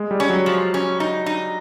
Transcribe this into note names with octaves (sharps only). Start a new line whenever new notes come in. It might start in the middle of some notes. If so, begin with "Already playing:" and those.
Already playing: G#3
G3
C#4
F#3
F3
C#4
D#4
D#4